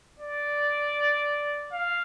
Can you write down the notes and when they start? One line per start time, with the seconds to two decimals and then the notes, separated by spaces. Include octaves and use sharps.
0.20 D5
1.73 F5